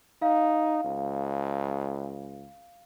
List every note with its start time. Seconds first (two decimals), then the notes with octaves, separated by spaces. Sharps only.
0.22 D#4 F5
0.85 C#2